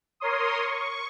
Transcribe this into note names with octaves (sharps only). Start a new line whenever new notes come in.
A#4 C#5 C6 D#6
C#6